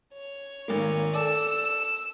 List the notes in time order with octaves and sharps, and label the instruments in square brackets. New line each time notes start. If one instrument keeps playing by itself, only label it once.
[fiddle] C#5
[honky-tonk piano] G#1 A#3
[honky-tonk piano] A4 D5 [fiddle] E6